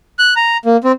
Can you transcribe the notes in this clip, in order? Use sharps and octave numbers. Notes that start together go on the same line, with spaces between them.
F#6
A#5
A#3
C4